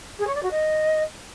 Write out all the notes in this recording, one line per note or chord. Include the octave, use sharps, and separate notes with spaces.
G#4
C#5
D5
F#4
D#5